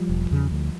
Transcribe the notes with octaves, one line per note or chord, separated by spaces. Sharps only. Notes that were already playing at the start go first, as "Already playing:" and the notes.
Already playing: F3 G3
E1
E2 C#3
D2